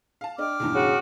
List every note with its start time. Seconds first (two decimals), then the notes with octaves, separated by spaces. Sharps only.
0.21 F5 A5
0.38 D4 D5 D#5 G5 D6 F6
0.60 B1 E2 G2
0.75 C#3 F#4